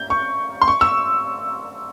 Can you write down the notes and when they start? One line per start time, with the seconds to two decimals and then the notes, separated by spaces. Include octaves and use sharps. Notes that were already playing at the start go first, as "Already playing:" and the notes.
Already playing: G6
0.10 C#6
0.62 C6
0.68 C#6
0.81 E6